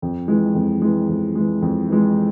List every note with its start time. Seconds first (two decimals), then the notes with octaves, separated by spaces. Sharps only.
0.02 F2
0.28 E3 G#3
0.55 F2
0.82 E3 G#3
1.09 F2
1.35 E3 G#3
1.62 F2
1.89 E3 G#3